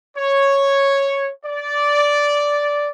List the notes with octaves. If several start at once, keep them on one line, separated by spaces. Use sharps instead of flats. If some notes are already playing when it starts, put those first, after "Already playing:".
C#5
D5